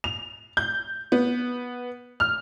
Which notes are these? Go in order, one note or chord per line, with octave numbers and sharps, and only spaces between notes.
F7
G6
B3
F6